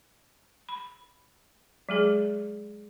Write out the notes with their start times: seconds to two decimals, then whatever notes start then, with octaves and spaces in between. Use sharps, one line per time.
0.69 B5
1.89 F#3 G#3 G#4